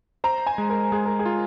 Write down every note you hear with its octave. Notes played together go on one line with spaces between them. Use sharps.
C5 A#5
G#5
G#3
A#4
G#3 G#4
A#4
G#4
F4